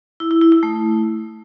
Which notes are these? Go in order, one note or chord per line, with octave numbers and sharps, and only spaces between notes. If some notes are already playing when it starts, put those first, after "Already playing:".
E4
E4
E4
E4
A3